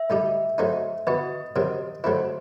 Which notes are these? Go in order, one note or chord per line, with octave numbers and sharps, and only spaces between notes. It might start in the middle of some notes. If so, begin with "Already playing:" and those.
Already playing: E5
A2 G3 D#4 G4
F#3 A3 C4 D#4
E3 B3 F#4 D#5
C3 D#3 F#3 C4
F#3 A3 C4 E4 C5